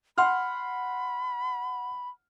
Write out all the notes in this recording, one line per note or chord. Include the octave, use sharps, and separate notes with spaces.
F#5 B5 C6 F6